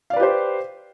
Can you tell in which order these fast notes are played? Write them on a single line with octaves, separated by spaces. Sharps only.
F5 D5 B4 G4 C5